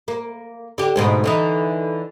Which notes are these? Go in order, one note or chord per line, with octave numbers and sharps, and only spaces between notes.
A#3
D3 G4
D2 G#2 B2
D3 E3 D#4